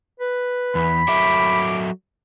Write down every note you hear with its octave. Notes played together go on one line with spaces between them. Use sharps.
B4
E2 B5
F#3 A4 E5 D6